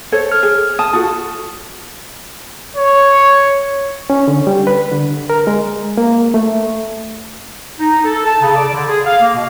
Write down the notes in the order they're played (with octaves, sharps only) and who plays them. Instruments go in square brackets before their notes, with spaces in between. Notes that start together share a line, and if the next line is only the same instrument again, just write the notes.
[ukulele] A4 C5 C#5
[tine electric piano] F6
[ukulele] G#4
[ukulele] A5 [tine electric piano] D#6
[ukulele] F4 F#4 A4
[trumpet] C#5
[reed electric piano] C#4
D3
G3
B4
D3
A#4
G#3
A#3
A3
[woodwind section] D#4
A4
A5
C#3
D5
D3
G#4
F5
A#3
B2